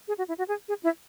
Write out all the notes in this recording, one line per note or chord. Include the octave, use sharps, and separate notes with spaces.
G#4
F#4
E4
F#4
G#4
G#4
E4